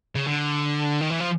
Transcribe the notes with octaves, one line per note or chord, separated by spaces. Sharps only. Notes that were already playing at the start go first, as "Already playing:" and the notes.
C#3
D3
D#3
E3
F3